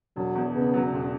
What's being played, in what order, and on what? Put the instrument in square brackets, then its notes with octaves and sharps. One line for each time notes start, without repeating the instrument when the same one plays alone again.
[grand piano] E1 [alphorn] F#3
[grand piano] E2
[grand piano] C#3 [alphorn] B3
[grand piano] F#3
E1